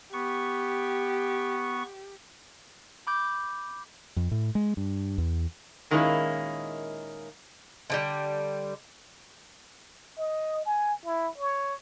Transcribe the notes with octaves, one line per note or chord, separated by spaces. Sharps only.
B3 G4 C#6
B5 D6 G6
F2
A2
G#3
G2
E2
A#2 D#3 G#3 A#3 C#4 E4
D3 F3 G3
D#5
G#5
E4
C#5